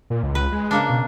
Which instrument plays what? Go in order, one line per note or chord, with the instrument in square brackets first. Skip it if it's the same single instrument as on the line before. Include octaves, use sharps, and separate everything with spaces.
[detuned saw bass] A#2
C#2
[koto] B4
[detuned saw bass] G#3
[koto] C#3 A#3 D4
[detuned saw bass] B2